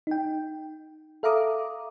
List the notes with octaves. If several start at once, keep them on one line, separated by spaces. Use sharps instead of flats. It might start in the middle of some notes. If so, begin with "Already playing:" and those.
D#4 G5
A4 E5 F5 A#5 D6 D#6